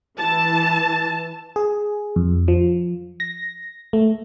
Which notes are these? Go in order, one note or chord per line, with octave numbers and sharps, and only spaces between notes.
E3 A5
G#4
F2
F3
A#6
A3